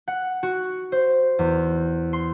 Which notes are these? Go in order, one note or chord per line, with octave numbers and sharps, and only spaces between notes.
F#5
F#4
C5
E2
C6